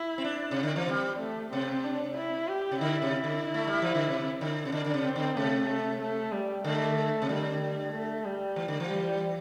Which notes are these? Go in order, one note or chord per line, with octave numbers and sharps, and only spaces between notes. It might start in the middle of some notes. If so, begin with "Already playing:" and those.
Already playing: E4
C4
D4
C3
D3
E3
G3 C4
A3
C3 C4
D4
E4
G4
C3
D3 E4
C3
E4
D3
A3
G3
E3
D3
C3
D3
C3
D3 D4
D3
C3
C4
D3
C3 A3
A3
A3
G3
D3 A3
C3
D3 G3
A3
G3
E3
D3
E3
G3